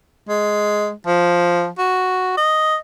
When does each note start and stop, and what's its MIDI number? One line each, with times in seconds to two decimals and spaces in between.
0.29 0.92 56
1.07 1.68 53
1.79 2.36 66
2.37 2.76 75